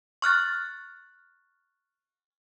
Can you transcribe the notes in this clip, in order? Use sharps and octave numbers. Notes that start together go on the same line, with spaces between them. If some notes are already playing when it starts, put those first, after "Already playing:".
C#6 F6 F#6 A6